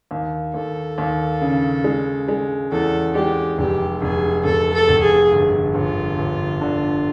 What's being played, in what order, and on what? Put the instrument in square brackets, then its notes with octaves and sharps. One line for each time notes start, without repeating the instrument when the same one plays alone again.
[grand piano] D#2
[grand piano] D#2 [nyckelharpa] A4
[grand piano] D#2
C#3
G#3
G#3
[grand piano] E2 [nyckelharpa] A4
[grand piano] G#3 [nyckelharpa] G4
[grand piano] F1 [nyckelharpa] G4
[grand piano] F1 [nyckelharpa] G#4
[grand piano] F1 [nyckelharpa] A4
[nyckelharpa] A4
[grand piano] F1
[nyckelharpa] G#4
[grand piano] G1
[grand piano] G1 [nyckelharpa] F4
[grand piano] G1
D3